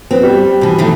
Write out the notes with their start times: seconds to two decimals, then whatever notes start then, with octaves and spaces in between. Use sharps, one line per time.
0.11 B3 C4
0.23 G3
0.61 B2 E3
0.78 D#3 E3 A3